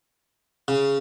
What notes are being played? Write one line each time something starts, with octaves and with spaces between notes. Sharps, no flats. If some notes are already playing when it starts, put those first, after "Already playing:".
C#3